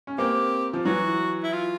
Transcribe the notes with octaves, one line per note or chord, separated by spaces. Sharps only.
C#4
A#3 C4 G4
F3
E3 F#3 F#4
E4
F4